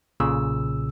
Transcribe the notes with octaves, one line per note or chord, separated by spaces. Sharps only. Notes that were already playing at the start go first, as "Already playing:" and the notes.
B1 A#2 C#3 E6